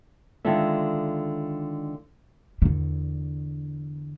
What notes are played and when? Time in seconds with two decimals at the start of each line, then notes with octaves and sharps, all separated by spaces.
0.45 D3 D#3 G#3 F4 A4 E5
2.62 E2 D3